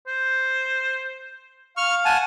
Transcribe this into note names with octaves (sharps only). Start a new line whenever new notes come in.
C5
F5 C#6 F6
F#5 G#5 A5